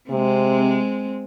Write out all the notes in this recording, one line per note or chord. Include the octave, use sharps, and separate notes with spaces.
C3 G#3 C4